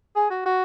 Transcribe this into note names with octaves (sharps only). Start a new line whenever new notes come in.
G#4
F#4
F#4